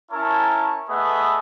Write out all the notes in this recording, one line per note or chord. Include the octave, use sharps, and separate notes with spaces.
C#4 E4 A#4 C#5 A5
A3 B3 G#4 B4 D#5 E5